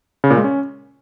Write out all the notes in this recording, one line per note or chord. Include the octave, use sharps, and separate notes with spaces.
C#3
A#2
G#3
C#4